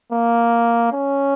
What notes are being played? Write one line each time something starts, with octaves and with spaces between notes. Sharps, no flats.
A#3
C#4